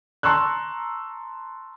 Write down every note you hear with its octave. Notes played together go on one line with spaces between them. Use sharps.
A5 A#5 C6 C#6 E6 F#6